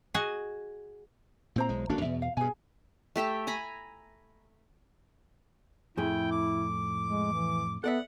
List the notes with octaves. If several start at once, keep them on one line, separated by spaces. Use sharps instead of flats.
F#4 G#4 D#5 F#5 G#5
A#2 C4 E4 C5 A#5
B1 G#3
G1 A#3 C#4 D4 F#4 A4
E2 B2 E5
F5
G2 B2 G#4 G#5
A3 G4 E5 G5
G#5 A#5 B5
F2 A2 E4 G#4 G5
D6
G#3
E3
B3 A4 D5 E5 F#5